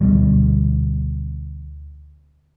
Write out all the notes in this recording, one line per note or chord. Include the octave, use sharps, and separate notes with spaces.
D2 B2 G3